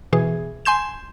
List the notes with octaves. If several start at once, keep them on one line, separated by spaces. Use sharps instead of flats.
B2 E3 G#4
G#5 C6 G6 E7